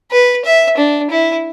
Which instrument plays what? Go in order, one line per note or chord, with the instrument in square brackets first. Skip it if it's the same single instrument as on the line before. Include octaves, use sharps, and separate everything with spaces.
[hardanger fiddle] B4
E5
D4
E4